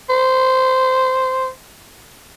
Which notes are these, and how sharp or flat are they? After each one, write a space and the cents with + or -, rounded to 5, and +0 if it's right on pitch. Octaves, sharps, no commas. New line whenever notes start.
C5 -10